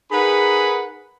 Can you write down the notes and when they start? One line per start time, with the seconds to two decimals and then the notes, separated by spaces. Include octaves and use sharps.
0.12 D#4 G#4 A#4 B4 F#5 B5